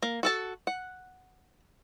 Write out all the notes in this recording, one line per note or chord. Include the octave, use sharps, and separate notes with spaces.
A#3
F#4 A4 A5
F#5